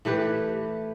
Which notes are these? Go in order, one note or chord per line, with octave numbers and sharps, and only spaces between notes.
E3 A3 G4 B4